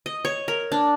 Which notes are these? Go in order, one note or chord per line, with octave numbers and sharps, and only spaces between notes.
D#5
C#5
A#4
D4